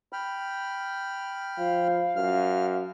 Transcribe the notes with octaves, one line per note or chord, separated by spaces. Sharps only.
G5 B5 F6
F3 F5
F#2 F6